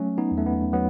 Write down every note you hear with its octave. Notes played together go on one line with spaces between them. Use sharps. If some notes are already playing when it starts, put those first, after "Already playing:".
Already playing: F#3 A3 C#4
B3 D#4
E2
A3
B3
F#3 B3